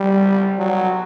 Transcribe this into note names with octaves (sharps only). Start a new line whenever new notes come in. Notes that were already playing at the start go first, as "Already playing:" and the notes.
Already playing: G3
F#3